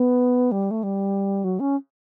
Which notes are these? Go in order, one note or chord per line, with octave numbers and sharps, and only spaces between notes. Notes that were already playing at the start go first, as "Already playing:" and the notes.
Already playing: B3
G3
A3
G3
F#3
C#4